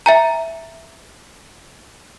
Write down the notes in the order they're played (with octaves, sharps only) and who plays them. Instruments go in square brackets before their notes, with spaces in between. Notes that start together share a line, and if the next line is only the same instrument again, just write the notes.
[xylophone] E5 G#5 A#5